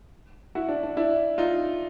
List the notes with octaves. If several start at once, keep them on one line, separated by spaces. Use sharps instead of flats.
E4 F#4
D4
D4
D4 E4
D#4 F4